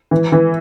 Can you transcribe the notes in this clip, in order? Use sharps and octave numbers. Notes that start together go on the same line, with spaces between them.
E3
E3